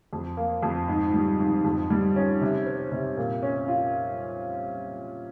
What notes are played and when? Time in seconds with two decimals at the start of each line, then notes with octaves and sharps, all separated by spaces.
0.13 F2
0.37 A#3
0.63 F2
0.88 G#2
1.14 G3
1.40 G#2
1.65 F2
1.90 G3
2.16 C#4
2.41 C3
2.66 C4
2.92 C3
3.17 A#2
3.43 C#4
3.68 F4